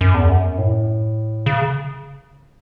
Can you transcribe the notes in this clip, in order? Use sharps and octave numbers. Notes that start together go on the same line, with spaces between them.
F#2
E2
F#2
A2
C#3